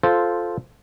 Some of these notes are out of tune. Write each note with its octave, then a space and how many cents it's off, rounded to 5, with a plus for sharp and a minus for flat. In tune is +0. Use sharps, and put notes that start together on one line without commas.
F4 +0 A4 -10 C5 -5